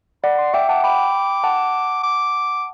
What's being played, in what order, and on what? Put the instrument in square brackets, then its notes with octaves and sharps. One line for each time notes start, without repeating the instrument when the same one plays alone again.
[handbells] D5 F#5 [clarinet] B5
[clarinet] C6
[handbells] E5 G5 [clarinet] D6
[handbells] F#5 A5 [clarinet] D6
[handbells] G5 B5 [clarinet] D6
[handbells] F#5 A5
[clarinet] D6